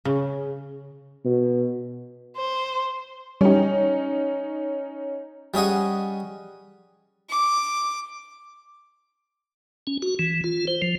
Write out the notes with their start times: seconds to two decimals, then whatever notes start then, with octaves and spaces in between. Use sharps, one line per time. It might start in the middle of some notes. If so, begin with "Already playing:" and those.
0.05 C#3
1.25 B2
2.36 C5
3.41 G3 C#4 D#4 G4
5.54 G3 C#4 G#4 D#5 F#5
7.30 D6
9.87 C#4
10.02 F#4
10.19 E3
10.44 F4
10.67 C5
10.82 F3